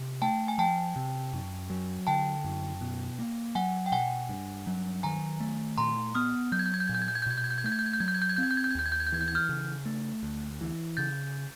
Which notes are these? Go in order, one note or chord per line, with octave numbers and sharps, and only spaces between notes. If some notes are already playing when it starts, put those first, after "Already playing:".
Already playing: C3
A3 G5 A5
G#5
F3 G5 A5
C3
F#2
F#3
D3 G5 A5
F#2
B2
A#3
F#3 F#5 G#5
G5
B2 F#5 G#5
G2
F#3
D#3 G#5 A#5
A3
A#2 A#5 C6
B3 D#6 F6
F#3 G6
G#6
G6
G#6
G6
A#2 G#6
G6
G#6
G6
G#6
G6
B2 G#6
G6
G#6
G6
G#6
A3 G6
G#6
G6
G#6
G6
F#3 G#6
G6
G#6
G6
G#6
C4 G6
G#6
G6
G#6
G6
G#6
D#2 G6
G#6
G6
G#6
G6
E3 G#6
G6
G#6
F6 G6
C#3
A3
D2
E3
C#3 G6 A6